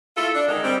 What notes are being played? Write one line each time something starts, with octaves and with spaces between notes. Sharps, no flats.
E4 F4 A4
D4
D3 D#3 G#3 D#4
G3 C4